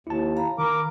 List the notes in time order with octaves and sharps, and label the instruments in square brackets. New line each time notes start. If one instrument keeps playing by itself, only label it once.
[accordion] D#2 [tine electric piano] E4 A5
[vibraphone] F5 A#5 B5
[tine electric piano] D#3 [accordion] A#4 D6